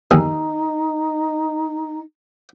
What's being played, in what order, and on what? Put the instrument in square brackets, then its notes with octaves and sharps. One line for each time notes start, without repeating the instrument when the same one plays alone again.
[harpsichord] D#2 G#4 [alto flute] D#4